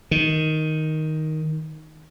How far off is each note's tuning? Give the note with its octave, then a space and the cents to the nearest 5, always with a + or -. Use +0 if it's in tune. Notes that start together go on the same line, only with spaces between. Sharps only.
D#3 +5